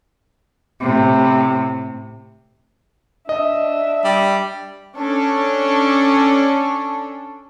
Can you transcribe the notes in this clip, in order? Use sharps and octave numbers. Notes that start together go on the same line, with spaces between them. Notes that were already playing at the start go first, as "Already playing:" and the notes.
A2 C3
D4 D#5 E5
G3
C#4 D4 A4